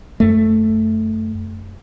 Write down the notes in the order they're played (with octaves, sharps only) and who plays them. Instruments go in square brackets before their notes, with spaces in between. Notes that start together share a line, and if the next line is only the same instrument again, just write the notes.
[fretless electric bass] F#2 A3